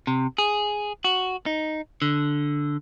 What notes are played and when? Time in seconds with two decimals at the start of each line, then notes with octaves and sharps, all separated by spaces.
0.07 C3
0.38 G#4
1.04 F#4
1.46 D#4
2.02 D3